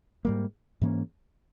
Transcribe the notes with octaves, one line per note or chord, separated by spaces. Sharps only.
G#2 G3 A#3
G#2 E3 A#3 C#4